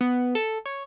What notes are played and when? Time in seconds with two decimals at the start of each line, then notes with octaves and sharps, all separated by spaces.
0.01 B3
0.35 A4
0.65 C#5